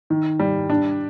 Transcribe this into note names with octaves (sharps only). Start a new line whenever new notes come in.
D#3
G3
D4